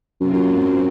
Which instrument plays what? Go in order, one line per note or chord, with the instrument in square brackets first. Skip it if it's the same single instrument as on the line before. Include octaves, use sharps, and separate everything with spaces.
[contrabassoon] F#2 [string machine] C3 F#3 A#3 F4
[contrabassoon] F#2
[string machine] G#2 F#3 C4